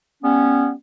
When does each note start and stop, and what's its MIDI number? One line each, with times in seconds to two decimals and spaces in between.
0.23 0.71 55
0.23 0.71 59
0.23 0.71 61